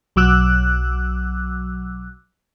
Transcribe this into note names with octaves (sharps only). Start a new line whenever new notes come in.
B1 F#3 D6 E6 F#6